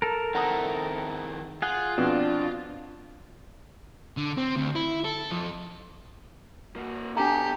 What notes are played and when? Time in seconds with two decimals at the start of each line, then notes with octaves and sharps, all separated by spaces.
0.02 A4 A#4
0.35 D#3 C4 E4 F#5 A#5 D#6
1.62 F4 G#4 F#5
1.98 B2 F3 C4 D4
4.17 D3
4.37 C4
4.56 D2
4.76 E4
5.05 A4
5.31 F2
6.76 A#3 F#4
7.17 B3 D4 G4 A4 A#5